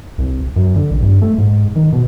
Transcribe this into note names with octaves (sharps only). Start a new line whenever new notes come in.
C2
F#2
D3
A#1
G2
A3
G#2
D#3
B2